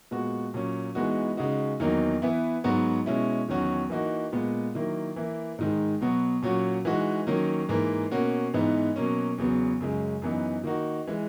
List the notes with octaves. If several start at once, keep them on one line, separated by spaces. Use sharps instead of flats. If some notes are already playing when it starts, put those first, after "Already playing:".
A#2 G#3 B3 F#4
A#2 F#3 C#4
E3 G#3 B3 D#4 F#4
C#3 G#3 D#4 F#4
E2 D#3 F#3 A#3 D#4
E3 B3 E4
G#2 F#3 B3 F#4
B2 G#3 C#4 E4
E2 D#3 F#3 C#4 F#4
E3 A#3 D#4 F#4
A#2 G#3 B3
D#3 F#3 A#3 E4
E3 A#3 E4
G#2 D#3 G#3
B2 F#3 B3 F#4
A#2 F#3 C#4 F#4
E3 G#3 D#4 F#4
D#3 F#3 A#3 C#4
G#2 E3 A#3
B2 A#3 C#4 F#4
G#2 E3 B3 D#4
B2 F#3 A#3 C#4
E2 C#3 F#3 B3
F#2 C#3 G#3
F#2 E3 B3 D#4
D#3 A#3 D#4 F#4
E3 G#3